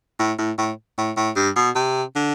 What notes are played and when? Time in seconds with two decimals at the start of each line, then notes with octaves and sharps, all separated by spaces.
0.19 A2
0.38 A2
0.58 A2
0.98 A2
1.17 A2
1.36 G2
1.56 B2
1.76 C3
2.15 D3